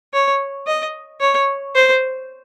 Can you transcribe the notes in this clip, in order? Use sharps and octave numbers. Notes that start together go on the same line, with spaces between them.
C#5
D#5
C#5
C5